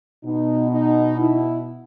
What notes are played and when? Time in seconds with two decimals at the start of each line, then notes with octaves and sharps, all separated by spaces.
0.24 B2 D#4
0.71 D#4
1.19 E4